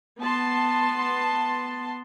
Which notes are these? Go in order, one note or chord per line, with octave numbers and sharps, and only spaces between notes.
B3 A5 C6